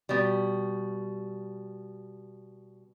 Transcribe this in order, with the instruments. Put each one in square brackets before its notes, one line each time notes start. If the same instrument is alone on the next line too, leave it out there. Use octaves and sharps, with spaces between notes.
[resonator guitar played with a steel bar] B2 G3